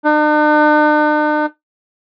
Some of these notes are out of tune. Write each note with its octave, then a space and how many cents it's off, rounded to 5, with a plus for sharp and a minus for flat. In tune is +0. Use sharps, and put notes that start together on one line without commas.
D4 +45